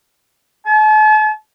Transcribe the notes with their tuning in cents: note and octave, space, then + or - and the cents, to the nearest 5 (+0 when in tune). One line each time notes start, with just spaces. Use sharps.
A5 -45